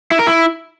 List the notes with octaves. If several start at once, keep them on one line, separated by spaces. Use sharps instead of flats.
E4
A#4
E4